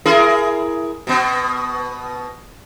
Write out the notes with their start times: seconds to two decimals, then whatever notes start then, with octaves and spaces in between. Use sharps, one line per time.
0.06 E4 G#4 A#4
1.07 B2 B3